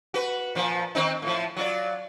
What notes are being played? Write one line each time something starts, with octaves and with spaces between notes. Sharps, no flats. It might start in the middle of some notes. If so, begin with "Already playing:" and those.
F#4 B4
A#2 F3
D#3 C4 D#4
A2 F3
F#3 F4 D5